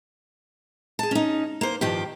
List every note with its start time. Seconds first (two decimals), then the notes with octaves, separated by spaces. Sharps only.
0.99 G#4 A5
1.11 C#4 D#4
1.61 A#3 C5
1.81 G2 D#3 F3 G4